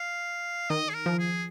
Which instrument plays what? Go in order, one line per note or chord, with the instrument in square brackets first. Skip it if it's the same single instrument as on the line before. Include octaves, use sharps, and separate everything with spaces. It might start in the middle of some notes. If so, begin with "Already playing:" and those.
Already playing: [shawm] F5
[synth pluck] D#3 [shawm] D#5
[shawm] G#4
A#4
[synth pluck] F3
[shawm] G#4